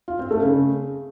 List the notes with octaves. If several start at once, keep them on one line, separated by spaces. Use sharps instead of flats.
F4
C4
A3
C#3